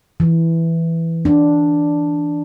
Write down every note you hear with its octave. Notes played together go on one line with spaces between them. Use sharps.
E3
D4